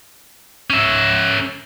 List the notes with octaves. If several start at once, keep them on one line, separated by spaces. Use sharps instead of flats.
C#4 E5